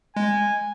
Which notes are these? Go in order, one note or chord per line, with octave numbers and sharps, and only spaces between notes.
G#3 G#5